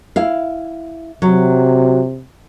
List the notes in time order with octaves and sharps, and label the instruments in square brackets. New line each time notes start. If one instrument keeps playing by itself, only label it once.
[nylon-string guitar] E4 F5
[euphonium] C3 [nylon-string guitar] F#3